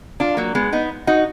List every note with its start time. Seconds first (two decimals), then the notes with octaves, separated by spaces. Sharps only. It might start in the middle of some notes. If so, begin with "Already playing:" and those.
0.20 D4 F4
0.37 F#3 A#3
0.55 G#3 B3
0.73 B3 D#4
1.07 D#4 F#4